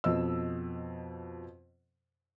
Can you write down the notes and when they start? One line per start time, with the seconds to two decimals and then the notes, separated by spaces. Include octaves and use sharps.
0.04 F2 B2 D#5 E6